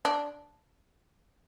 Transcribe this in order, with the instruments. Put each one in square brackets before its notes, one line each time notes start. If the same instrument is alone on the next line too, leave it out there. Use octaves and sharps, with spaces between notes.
[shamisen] D4